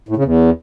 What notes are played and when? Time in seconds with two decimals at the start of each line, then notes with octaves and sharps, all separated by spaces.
0.09 A2
0.16 C#3
0.24 E2